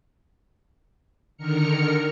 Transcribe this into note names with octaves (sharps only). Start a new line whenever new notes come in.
D3 D#3 A#4 F6 C#7